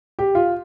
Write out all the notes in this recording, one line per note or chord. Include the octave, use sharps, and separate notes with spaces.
G4
F4